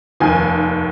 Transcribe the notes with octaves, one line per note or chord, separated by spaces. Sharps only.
F1 D#2 D#3 G#5